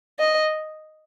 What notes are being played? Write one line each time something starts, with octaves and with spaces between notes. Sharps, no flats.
D#5